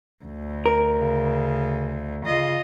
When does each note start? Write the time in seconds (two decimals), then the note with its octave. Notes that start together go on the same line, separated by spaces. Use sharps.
0.25 D2
0.66 A#4
1.00 C#3
2.26 C#3 F4 D#5